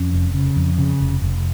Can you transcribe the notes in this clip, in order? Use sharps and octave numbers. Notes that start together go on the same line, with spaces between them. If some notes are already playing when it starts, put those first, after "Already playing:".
Already playing: F2 C#4
F1
C#3
F2
C#3
F1
F1